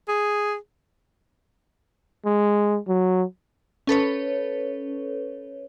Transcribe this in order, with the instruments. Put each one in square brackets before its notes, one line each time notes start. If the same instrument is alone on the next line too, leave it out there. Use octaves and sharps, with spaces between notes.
[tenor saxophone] G#4
[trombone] G#3
F#3
[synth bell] C#4 A4 B4 C#5